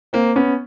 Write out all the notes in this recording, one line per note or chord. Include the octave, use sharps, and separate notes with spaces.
A#3 C4
B3 C#4